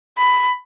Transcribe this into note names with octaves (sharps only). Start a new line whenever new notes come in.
B5